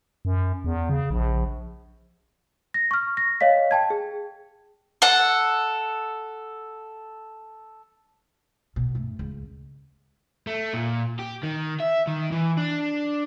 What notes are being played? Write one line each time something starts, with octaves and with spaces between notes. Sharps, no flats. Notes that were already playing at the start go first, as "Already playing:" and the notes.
F#2
E2
C#3
A#1
A#6
C#6 F6
A#6
C#5 D#5 F5 B6
G5 A5 G#6
G#4
A4 F#5
B1 B2
G2 A3
C#2
A3
A#2
G4
D#3
E5
D#3
E3
D4